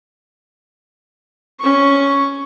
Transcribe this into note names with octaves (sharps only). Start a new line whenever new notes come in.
C#4 C#6